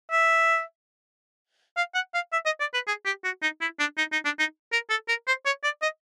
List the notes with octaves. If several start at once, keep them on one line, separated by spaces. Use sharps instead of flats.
E5
F5
F#5
F5
E5
D#5
D5
B4
G#4
G4
F#4
D#4
E4
D4
D#4
D#4
D4
D#4
A#4
A4
A#4
C5
C#5
D5
D#5